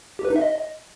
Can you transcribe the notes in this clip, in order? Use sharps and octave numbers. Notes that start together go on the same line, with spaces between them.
G4
B4
D#4
E5
D#5